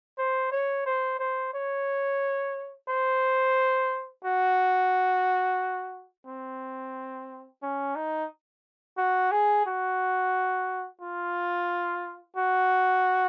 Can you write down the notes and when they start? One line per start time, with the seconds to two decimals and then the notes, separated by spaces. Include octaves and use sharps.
0.18 C5
0.51 C#5
0.86 C5
1.19 C5
1.53 C#5
2.88 C5
4.24 F#4
6.26 C4
7.62 C#4
7.95 D#4
8.98 F#4
9.31 G#4
9.66 F#4
11.01 F4
12.36 F#4